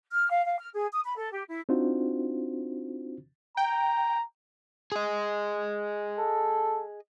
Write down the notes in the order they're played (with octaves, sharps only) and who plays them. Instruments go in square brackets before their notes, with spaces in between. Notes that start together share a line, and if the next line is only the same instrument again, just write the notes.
[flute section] F6
F5
F5
F6
G#4
D#6
B5
A4
G4
E4
[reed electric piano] C4 D4 D#4 F4 F#4 C5
[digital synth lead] G5 [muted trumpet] A#5
[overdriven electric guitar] G#4 D#5
[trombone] A4